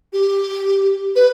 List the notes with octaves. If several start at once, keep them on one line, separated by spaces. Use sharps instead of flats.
G4
B4